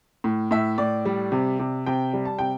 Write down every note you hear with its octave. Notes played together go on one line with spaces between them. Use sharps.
A2
A2 E5
A2 D5
G3
C3
C3
C3 G5
G3
A5
C3 G5